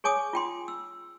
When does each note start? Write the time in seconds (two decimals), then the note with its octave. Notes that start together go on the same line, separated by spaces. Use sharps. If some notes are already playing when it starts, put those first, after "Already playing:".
0.04 G#4 C#5 G#5 D6 D#6
0.33 F4 G5 C6
0.68 E6